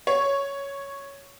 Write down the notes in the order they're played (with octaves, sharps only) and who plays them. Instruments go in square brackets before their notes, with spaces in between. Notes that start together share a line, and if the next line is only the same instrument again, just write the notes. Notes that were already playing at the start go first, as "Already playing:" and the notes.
[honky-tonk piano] C#5